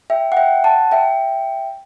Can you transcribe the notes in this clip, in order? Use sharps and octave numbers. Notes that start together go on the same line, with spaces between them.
E5 G5
F#5
E5 G5
F#5 A5
E5 G5